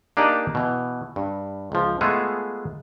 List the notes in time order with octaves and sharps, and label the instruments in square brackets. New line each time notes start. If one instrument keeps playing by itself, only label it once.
[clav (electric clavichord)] A#3 D4 D#4 G4 D5 D#5
B2 E3
G2
C#2 F3
G#3 A3 B3 F4 G#4 A4